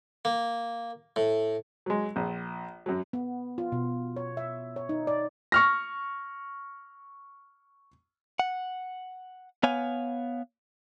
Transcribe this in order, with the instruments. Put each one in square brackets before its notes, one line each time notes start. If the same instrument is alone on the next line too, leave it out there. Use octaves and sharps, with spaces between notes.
[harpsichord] A#3
A2
[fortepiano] F#3 G#3
A#1
F#2 F#3
[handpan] B3
F4
B2
C#5
E5
C#5
D#4
D5
[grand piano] C#6 F6 A#6
[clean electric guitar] F#5
B3 C#5 F5 G#5